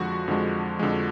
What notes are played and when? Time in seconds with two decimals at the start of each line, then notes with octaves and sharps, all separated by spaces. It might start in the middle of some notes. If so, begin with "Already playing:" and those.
Already playing: F2 D3 F3 G#3 F#4
0.28 F2 D3 F3 G#3
0.79 F2 D3 F3 G#3